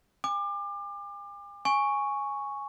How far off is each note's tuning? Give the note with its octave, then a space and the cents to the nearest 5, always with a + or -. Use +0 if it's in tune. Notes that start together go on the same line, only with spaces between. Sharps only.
G#5 -45 D6 +30
G#5 +0 C#6 +0